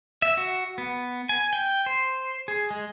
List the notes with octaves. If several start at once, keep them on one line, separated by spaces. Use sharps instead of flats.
E5
F#4
B3
G#5
G5
C5
G#4
G#3